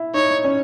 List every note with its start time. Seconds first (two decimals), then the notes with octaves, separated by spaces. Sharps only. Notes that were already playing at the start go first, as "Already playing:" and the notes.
Already playing: E4
0.14 D#4 C#5
0.44 C#4